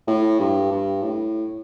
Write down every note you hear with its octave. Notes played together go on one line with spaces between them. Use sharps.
A2
G2
G2
A2